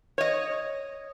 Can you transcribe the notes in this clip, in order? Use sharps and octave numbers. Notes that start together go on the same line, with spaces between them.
C#5 D#5